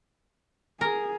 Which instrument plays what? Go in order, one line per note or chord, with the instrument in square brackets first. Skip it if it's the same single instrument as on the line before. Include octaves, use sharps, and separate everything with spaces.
[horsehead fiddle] G#4 [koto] A#4